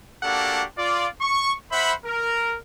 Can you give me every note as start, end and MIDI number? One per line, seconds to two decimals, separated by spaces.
0.24 0.65 58
0.24 0.65 62
0.24 0.65 66
0.24 0.65 67
0.24 0.65 69
0.24 0.65 78
0.77 1.07 65
0.77 1.07 74
1.21 1.53 85
1.72 1.93 72
1.72 1.93 76
1.72 1.93 78
1.72 1.93 83
2.05 2.57 70